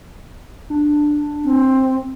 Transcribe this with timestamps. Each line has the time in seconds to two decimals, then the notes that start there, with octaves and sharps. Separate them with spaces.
0.70 D4
1.45 C4